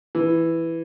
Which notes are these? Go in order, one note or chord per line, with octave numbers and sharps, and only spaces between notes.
E3